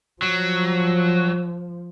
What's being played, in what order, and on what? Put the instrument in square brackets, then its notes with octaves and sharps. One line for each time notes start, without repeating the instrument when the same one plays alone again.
[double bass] F3 [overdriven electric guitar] F#3